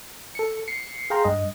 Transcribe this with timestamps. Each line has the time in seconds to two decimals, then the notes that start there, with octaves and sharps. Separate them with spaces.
0.35 A4 C#7
0.68 C7 C#7
1.10 G#4 F5 G5 A#5 C6
1.24 G2 D#5